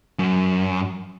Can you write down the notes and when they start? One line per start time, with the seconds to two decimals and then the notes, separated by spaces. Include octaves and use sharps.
0.19 F#2